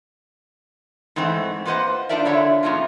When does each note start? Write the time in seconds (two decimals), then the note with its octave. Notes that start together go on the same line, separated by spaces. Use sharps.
1.16 G#2 E3 A3 C4 D#4
1.65 A#3 F4 B4 C5 D#5 F#5
2.09 D4 D#4 F4 A#4 D5 E5
2.25 D3 E4 F4 C#5 E5
2.63 A#2 C#3 F3 B3 D#4 F4